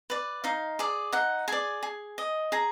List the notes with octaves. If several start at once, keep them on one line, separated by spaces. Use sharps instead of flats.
B4 D5
D#4 F5
G#4 D5
D#4 F#5
G#4 D5 G#5
G#4
D#5
G#4 A#5